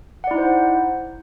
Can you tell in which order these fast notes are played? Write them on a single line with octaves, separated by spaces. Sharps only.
F#5 D5 E4 D#4 C5